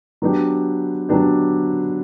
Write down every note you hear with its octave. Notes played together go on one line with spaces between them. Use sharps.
F#3 B3 D4 G4
F#3 B3 D4 G4